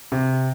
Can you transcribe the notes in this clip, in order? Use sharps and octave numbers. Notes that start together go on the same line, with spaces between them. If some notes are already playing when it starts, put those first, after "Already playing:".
C3